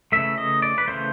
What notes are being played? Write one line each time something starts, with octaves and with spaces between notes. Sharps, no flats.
C#3 E3 A3 E5
D#5
D5
B4
C#3 E3 A3 C5